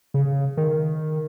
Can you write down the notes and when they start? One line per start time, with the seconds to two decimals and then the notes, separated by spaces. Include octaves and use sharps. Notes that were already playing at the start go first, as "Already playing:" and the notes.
0.14 C#3
0.57 D#3